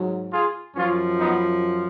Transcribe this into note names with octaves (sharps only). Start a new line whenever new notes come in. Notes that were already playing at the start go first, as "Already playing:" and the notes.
Already playing: G#2 F#3
F4 G#4
F#2 F3 C#4 F4
B3 D#4